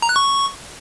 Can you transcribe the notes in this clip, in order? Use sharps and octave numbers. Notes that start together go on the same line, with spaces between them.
A#5
F#6
C#6